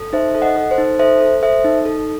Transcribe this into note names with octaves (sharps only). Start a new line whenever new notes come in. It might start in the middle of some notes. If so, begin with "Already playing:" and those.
Already playing: A4
D#4 C5 E5
A4
D#5 F#5
A4
C5
D#4
A4 C5 E5
A4
A4 C5 E5
D#4
A4